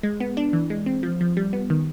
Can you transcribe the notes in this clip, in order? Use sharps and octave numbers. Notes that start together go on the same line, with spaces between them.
G#3
B3
D4
E3
G#3
C4
F3
F3
G3
B3
D#3